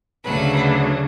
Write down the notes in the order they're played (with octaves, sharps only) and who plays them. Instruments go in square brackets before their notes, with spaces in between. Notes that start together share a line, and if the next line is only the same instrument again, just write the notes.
[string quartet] D2 C#3 F#3 A3 B4